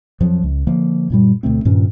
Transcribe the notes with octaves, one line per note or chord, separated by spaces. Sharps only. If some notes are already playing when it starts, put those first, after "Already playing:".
F2 F3 F#3
C#2
D3 F3 A#3
F#2 A#2 G3
D2 B2 A3 C4
G2 A#2 D#3 C#4